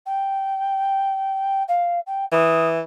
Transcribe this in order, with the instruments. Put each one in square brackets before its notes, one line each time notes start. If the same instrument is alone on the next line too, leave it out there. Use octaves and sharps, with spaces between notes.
[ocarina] G5
F5
G5
[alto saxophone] E3 [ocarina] D#6